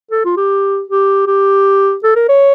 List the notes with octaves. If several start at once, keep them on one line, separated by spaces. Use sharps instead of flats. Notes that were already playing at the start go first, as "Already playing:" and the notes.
A4
F4
G4
G4
G4
A4
A#4
C#5